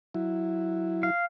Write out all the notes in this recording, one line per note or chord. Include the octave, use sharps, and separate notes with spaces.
F#3 E4
F5